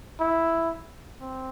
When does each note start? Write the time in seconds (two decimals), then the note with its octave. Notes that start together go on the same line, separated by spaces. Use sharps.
0.19 E4
1.21 C4